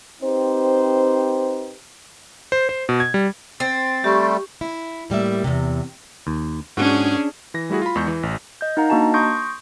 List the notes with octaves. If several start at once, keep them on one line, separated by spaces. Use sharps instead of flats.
C4 D#4 G4 B4 C5
C5
C5
B2
G#6
G3
C4 A6
G3 A3 G4 C#6
E4
A2 G3 A#3 E5
E2 C3
D#2
G#2 C#4 D4 F#4 G#4
E3 A#6
G3 A3 E4 F#4 G#4
F4 B5
E2 G#3 C#6 G6
E3
A1
D#5 G6
D#4 A#4 F5 F#5 A#5
A#3 D4 F#4 D#5 A5 A#5
C6 C#6 D#6 G6 A#6 D7